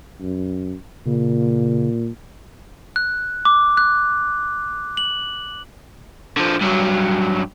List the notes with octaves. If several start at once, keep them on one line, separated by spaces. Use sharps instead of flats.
F#2
A#2 C#3
F#6
D6
F#6
F#7
D3 F3
G2 F#3